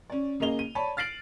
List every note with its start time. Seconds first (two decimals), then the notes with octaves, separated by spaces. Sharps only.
0.10 C#4 D5
0.40 C#3 A#3 G#4 D#5 F7 G7
0.59 D#7
0.75 C#5 D5 A5 B5
0.97 F6 A6 C7 D7 F#7